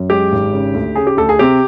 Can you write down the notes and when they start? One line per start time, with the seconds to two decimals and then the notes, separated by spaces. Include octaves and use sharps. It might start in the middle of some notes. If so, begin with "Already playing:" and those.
Already playing: F#2
0.10 G#3 G4
0.32 G#1
0.53 C#3
0.74 D2
0.96 C#3 G#4
1.07 G4
1.17 D2 A4
1.29 G#4
1.39 C3 G4